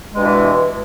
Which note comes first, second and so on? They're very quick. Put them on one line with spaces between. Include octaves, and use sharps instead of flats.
G#3 G2 B2 E3